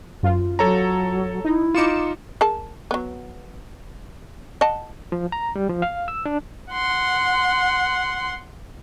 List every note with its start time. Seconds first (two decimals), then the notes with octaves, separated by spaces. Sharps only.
0.23 F#2 F4
0.59 F#3 A4 C#5 A#5
1.45 D#4 E4
1.75 D#4 F4 D6 C#7 E7
2.41 G#4 A#4 A5
2.91 F#3 B3
4.61 D#5 F#5 A5
5.12 F3
5.32 A#5
5.56 G3
5.70 F3
5.82 F5
6.08 E6
6.26 D4
6.72 F#5 C6